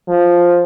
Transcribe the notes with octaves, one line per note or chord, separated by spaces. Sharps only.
F3